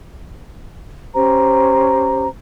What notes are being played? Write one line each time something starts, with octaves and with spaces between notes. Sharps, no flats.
C#4 G4 C5 A#5